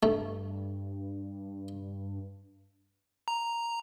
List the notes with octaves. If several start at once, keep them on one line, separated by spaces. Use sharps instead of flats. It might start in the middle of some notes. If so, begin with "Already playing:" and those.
G2 A3
A#5